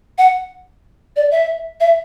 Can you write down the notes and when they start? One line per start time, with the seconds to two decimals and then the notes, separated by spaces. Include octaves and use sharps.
0.18 F#5
1.16 D5
1.31 E5
1.80 E5